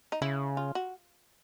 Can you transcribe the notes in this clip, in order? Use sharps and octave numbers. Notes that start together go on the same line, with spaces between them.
D#4
C#3 E4
F4
F#4